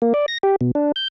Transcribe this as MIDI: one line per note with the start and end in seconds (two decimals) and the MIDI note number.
0.02 0.13 58
0.14 0.26 74
0.28 0.38 94
0.43 0.56 67
0.61 0.71 47
0.75 0.92 62
0.96 1.08 91